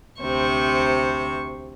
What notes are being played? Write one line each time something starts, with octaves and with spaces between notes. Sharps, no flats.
D2 C3 C5 C#6